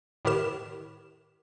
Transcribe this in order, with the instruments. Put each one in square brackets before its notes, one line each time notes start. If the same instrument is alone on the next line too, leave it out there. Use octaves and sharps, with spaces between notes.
[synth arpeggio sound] A2 D#3 G4 A#4 E7